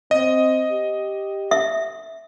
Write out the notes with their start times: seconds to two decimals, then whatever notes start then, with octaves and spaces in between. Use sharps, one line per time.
0.11 C4 D#5
0.71 G4
1.51 E5